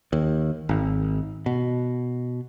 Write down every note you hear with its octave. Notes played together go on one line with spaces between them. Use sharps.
D#2
G#1
B2